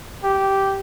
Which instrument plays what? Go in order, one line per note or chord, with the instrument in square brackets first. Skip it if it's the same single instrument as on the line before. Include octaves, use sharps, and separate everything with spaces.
[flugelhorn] G4